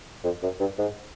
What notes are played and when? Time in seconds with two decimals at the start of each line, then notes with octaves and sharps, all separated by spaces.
0.24 F2
0.43 F#2
0.60 G2
0.78 G#2